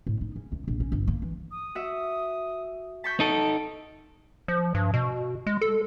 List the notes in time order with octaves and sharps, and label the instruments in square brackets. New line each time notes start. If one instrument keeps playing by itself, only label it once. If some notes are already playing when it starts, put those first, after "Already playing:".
[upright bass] A2
D#4
C#3
C#2
A#1
C#4
G1
A#3
E3
[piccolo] D#6
[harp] F#4 E5
[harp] A5 C#6 G6 [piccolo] B6
[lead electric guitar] D#4 A4 [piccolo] D7
[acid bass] F3
G2
B2
G#3
A4